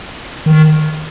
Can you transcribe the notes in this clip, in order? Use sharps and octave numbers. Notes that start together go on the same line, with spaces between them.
D#3